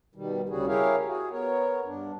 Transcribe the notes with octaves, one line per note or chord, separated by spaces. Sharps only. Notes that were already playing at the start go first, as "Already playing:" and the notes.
B2 D#3 G3
D2 C#3 G3 F#4 G#4
E4 G4 G#4 A#4 C#5 F5
F#4 G#4
B3 A#4 C#5
G2 D4